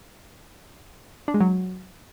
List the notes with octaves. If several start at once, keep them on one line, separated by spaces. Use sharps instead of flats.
D4
G#3
F#3